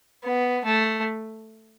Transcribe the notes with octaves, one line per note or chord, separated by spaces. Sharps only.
B3
A3